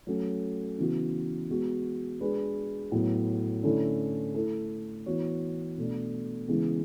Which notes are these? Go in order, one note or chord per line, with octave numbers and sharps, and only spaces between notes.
F#3 A3 C#4
C#3 E3 B3 F#4
G#3 B3 F#4
G#3 D4 G#4 B4
A2 F#3 B3
D3 A3 C#4 E4
A3 E4 A4
E3 B3 F#4 C#5
B2 A3 D4
C#3 E3 G#3 B3